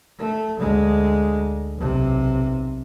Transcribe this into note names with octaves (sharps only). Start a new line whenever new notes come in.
A3
D2 G#3
B1 C3